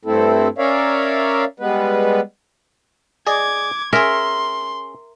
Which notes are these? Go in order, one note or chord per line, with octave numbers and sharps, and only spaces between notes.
G2 A3 C4 E4 A4
C#4 A#4 C#5 D5 E5 F5
G3 G#3 B3 B4
G#4 D5 D#5 D6 G#6
C#4 G#4 A#4 E5 C6